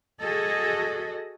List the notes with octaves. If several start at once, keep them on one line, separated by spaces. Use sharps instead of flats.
F#4 G#4 A4 D#5